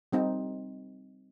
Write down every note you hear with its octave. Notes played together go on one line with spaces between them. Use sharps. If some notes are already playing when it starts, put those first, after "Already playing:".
G3 C4 D#4